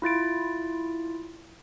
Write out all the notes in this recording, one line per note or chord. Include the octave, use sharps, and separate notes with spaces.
E4 F4 A6 D7